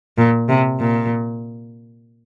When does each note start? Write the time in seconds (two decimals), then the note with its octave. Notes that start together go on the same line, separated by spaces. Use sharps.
0.18 A#2
0.49 C3
0.80 A#2